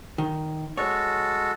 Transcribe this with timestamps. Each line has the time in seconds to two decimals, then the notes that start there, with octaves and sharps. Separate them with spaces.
0.18 D#3
0.77 G#3 F#4 A4 C#5